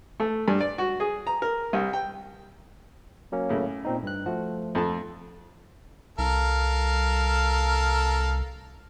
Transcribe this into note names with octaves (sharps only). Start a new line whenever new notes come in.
A3
G2
D5
F#4
G#4
A#5
A#4
C2
G5
F#3 A#3 C#4
A2 C#3
A#2 C4 D#4
G2 F#6
F3 A3 F#4
F2 A4 A5
C2 A4 A#4 F5